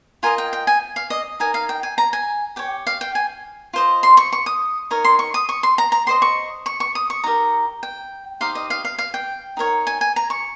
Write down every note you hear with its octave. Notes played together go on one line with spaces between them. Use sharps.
F4 A#4 D#5 G#5
G5
G5
G#5
F5
D#5
D#4 A#4 D#5 G#5
F5
G5
G#5
A#5
G#5
G4 C#5 G5
F5
G5
G#5
F4 C5 D#5
C6
C#6
C#6
D#6
D#4 A#4 C#5
C6
C#6
D#6
C#6
C6
A#5
A#5
G4 C5 D#5 C6
C#6
C#6
C#6
D#6
C#6
D#4 G4 A#4 A#5
G5
D#4 G4 C5 F5
D#5
F5
F5
F5
G5
D#4 A#4 C#5
G#5
G#5
A#5
C#6